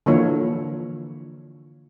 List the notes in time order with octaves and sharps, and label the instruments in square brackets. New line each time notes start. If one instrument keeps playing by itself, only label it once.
[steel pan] D3 E3 F3 A#3 C#5